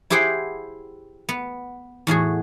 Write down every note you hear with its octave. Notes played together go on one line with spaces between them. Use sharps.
E4 G4 G#4 C5 F#5 G5
B3
E2 A2 F#4 G#4